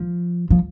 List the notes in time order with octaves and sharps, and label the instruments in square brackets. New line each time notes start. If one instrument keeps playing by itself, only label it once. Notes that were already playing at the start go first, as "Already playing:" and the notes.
Already playing: [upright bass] F3
F3